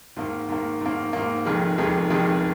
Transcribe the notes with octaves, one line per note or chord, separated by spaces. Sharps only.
G#2 D#3 A#3
G#2 D#3 A#3
G#2 D#3 A#3
G#2 D#3 A#3
F1 F2 D#3 G#3
F1 F2 D#3 G#3
F1 F2 D#3 G#3